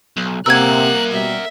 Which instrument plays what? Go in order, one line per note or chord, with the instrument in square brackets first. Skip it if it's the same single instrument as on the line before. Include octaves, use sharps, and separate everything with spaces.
[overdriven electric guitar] B1
[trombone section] C3 [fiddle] A#3 F#6 [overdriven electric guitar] A#4 F#5 [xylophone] E6 G#6
[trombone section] B2 G3 [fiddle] E5